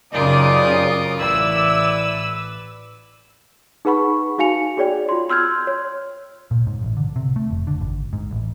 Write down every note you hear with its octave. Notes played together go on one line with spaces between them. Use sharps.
F#2 C#3 D#4 F4 G4 A#4 D5 D#6
A1 E4 B4 D5 E6
D#4 G#4 B4 F#5 B5 C#6
D#4 F#4 F5 G#5 C#7 F7
F#4 G#4 C#5 D5 G5
F4 C6
C6 E6 F6 G6 G#6
C#5
A#2
G#2
A1
D3
C3
A3
F1
D3
G#1
G#2
A1